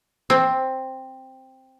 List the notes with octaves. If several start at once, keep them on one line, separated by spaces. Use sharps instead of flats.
C4